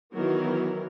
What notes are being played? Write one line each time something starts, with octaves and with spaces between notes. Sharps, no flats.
D#3 E3 F#3 B3 A#4